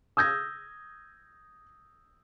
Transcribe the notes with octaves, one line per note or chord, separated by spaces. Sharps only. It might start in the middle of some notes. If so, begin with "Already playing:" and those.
D#6 E6 G6 G#6 A#6